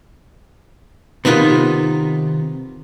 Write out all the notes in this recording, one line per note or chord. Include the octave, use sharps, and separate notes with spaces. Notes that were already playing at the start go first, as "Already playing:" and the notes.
C3 D#3 B3 D#4 F4